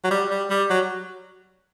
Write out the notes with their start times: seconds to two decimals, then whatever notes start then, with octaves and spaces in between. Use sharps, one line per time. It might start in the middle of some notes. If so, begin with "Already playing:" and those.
0.04 F#3
0.11 G3
0.30 G3
0.50 G3
0.70 F#3